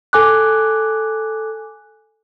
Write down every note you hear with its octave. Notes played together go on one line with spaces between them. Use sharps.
A4 G#5 D6 F#6